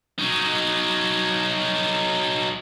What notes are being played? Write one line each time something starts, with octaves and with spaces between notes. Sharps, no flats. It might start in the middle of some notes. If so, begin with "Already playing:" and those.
F#3 D#4